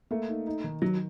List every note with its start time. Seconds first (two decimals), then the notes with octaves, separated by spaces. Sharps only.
0.11 A3 A#3
0.29 D#4
0.47 D#4
0.64 D#3
0.82 D#3 F#3